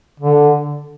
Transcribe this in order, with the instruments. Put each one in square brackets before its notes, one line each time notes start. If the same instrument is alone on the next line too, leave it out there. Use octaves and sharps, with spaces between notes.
[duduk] D3